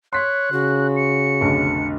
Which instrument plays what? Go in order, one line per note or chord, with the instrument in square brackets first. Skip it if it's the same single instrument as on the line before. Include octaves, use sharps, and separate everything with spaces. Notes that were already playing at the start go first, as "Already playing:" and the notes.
[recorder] C#5 [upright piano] C6 B6 [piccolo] F#6
[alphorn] C#3 [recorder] F#4
[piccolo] C#7
[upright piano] F1 B1 D3